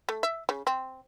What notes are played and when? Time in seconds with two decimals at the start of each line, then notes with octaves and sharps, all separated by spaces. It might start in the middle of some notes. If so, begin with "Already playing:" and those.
0.09 A3
0.23 E5
0.49 C#3
0.67 C4